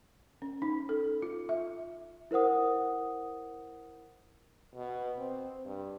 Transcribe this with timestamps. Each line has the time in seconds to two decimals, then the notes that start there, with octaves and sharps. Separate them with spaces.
0.42 C#4
0.62 D#4
0.89 A4
1.22 F4
1.49 E5
2.31 E4 A#4 C5 F#5 D#6
4.75 B2
5.18 C4
5.66 G2